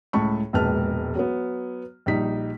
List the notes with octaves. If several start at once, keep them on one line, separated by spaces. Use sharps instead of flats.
C#2 A2 A5 B5 C#6
E1 A#1 G#2 B4 A5 F6
F#3 B3
A#1 G3 D#4 B6